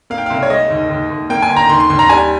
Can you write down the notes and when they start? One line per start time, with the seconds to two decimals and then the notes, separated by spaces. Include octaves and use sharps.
0.10 A#3 F5
0.18 G5
0.26 C2 F5
0.43 C#5
0.50 G#3 D#5
0.70 D#2
0.90 D#2
1.10 D#2
1.30 A#3 G5
1.42 G#5
1.49 G1
1.56 A#5
1.69 D#2 C6
1.80 C6
1.90 D#2 C6
1.99 A#5
2.09 G3 G#5